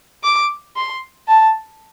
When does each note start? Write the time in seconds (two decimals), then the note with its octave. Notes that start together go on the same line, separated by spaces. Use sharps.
0.24 D6
0.76 C6
1.28 A5